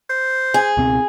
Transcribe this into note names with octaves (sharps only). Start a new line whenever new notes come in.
C5
G#4
C#2 B2 C4